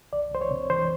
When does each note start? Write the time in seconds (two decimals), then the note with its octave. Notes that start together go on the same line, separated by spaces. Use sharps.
0.13 C2 D5
0.32 C2 C5
0.41 C#5
0.51 C3
0.70 E3 C5